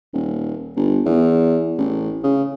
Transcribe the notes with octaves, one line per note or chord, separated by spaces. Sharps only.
D#1
G1
E2
A1
C#3